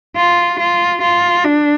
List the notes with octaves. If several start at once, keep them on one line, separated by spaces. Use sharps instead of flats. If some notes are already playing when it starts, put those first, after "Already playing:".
F4
F4
F4
D4